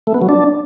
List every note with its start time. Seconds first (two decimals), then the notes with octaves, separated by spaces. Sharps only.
0.07 A3
0.14 B3
0.22 F#3
0.29 D4